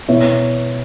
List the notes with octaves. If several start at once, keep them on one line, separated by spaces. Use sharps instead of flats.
B2 B3 E4 C#5 E5